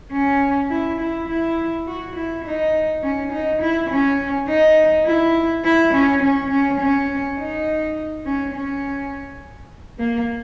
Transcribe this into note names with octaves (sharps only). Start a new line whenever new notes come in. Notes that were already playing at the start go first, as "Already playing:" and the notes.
C#4
E4
E4
E4
F#4
E4
D#4
C#4
D#4
E4
C#4
D#4
E4
E4
C#4
C#4
C#4
C#4
D#4
C#4
C#4
A#3